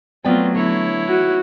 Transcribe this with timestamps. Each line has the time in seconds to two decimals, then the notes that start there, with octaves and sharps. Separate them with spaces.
0.24 F#3 A3 B3 C4 F4 D5 G5
0.55 D3 E4 C#5
1.09 F#4